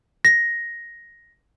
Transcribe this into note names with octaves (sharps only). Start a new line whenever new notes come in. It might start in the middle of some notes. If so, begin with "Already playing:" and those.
A#6